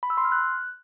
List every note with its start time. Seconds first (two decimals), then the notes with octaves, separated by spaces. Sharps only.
0.03 B5
0.10 E6
0.17 C6
0.25 F6
0.32 F#6